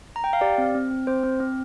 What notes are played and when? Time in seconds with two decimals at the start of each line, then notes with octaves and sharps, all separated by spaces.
0.16 A#5
0.24 G5
0.33 F5
0.41 G4 D5
0.58 C4
0.75 C4
0.91 C4
1.07 C4 C5
1.23 C4
1.40 C4